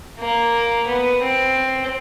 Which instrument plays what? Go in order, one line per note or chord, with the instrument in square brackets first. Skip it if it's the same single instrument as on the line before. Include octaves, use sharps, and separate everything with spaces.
[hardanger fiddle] A#3
B3
C4